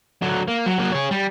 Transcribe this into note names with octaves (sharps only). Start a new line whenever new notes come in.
D3 F#3
A#3
F#3
F#3 A#3
G#4 C#5
G3